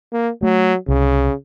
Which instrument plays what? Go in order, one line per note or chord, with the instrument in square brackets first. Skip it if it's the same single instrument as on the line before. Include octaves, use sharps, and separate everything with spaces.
[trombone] A#3
[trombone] F#3 [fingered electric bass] A3
[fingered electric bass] C2 [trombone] C#3